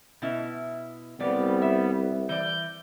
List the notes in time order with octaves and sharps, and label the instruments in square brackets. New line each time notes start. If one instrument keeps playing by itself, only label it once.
[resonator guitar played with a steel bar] B2 E4
[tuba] C2 [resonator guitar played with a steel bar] F3 D5 [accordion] G3 B3
[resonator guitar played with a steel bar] E5
[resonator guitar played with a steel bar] E3 D5 [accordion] G6